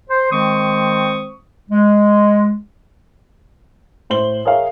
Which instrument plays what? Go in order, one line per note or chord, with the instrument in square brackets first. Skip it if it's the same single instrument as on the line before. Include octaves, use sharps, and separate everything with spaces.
[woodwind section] C5
D#3 G#3 C4 C5 C#6 D#6
G#3
[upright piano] A2 C5 F#7 G7
G#4 A#4 C#5 E5 F5